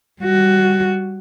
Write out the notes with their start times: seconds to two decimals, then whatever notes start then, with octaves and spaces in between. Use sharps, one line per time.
0.22 G3 F#4